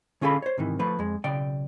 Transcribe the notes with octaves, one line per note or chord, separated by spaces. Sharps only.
D3 C#4 F4 G#4 A4 B5
C5 C#5
G#2 C3 D#3 E3
F3 A3 B4
F2 G#3
B1 C#3 D5 G5